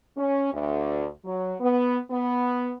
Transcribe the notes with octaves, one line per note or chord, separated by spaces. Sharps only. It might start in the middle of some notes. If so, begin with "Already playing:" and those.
C#4
D2
F#3
B3
B3